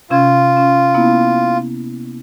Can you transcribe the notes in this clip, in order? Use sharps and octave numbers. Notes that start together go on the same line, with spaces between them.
C3 C#4 F4 G#6
C#4
A#3 B3 E4